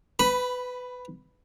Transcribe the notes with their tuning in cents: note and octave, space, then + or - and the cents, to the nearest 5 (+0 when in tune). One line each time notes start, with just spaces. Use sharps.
B4 +20 B5 +0